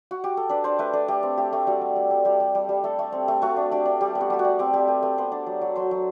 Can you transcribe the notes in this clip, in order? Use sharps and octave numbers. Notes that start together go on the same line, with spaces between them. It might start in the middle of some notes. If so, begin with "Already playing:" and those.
F#4
G4
A4
D4 B4
D4 C5
A3 B4
D4 A4
A3 G4
C4
A3 G4
A3
G3 F#4
G3
G3
G3
G3 G4
G3
G3
G3
A3 A4
A3
C4
A3
A3 F#4
D4
D4 G4
D4
G3 G4
B3
F#4
G3 G4
F#4
G3
C4 G4
C4 G4
A3 B4
A3 B4
B3 C5
D4
F#3
F#3
F#3 C5
F#3